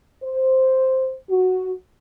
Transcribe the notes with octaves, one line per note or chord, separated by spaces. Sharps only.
C5
F#4